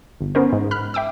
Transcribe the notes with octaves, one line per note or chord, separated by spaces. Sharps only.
G1
B3 C#4 A#4 C5
G#2
B5 F6 F#6
E5 G5 D6 E6